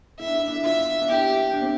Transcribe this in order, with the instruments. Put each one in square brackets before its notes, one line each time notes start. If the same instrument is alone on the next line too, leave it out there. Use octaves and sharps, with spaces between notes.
[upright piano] E4 [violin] E5
[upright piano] D4
E4
D4
E4
[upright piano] F4 [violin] E5
[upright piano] D4
[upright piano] E4 [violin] G4
[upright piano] D4
C4